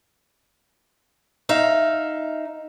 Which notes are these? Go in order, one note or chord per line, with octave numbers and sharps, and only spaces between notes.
D#4 E5 F5